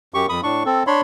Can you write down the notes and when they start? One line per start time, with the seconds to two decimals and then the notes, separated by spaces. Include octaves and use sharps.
0.14 F#2 G4 C#6
0.29 F2 B5 D#6
0.43 A2 D4 C#6
0.66 C4 A4
0.87 D4 C#5 B5 C6